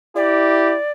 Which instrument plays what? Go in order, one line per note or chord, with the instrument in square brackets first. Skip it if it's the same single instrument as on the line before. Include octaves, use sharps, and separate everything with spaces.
[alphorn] E4 [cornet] G4 [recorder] D5